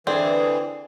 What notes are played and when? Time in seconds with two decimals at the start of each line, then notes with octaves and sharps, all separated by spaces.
0.07 D3 E3 C4 G#4 D5